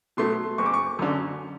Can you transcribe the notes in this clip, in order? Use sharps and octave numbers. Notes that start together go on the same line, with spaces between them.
B2 F#3 A3 C6
F#1 C#6
D6
C#6
F#2 D3